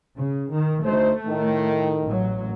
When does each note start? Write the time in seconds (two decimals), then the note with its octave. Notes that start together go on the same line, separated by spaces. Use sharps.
0.18 C#3
0.52 D#3
0.85 D2 A3 D#4 C5
1.26 A2 D#3
2.04 A1 F#3